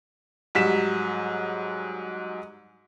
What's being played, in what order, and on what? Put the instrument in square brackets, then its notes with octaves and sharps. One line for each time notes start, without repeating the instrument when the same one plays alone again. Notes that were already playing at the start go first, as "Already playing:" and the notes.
[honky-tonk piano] G#2 F#3 G3 B6 E7